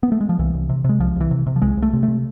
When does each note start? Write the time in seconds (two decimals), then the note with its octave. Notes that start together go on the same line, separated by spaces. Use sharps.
0.03 B3
0.12 A3
0.21 G#3
0.29 F3
0.39 C2 E3
0.54 C2
0.69 C3
0.84 C3 G#3
1.00 C2 F3
1.16 C2 E3
1.31 C3
1.47 C3
1.56 F3
1.62 C2 G#3
1.77 C2
1.82 A3
1.93 C3
2.03 A3
2.08 C3